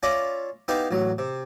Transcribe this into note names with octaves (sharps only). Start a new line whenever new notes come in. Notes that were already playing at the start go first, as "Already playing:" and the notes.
C#4 F4 D5 E5 A#5
B3 D#4 E4 G4 F5
A1 F#3
C3